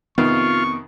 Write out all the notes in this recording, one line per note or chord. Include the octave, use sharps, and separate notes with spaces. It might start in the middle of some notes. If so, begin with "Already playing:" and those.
F2 C3 D#3 B3 F4 C#6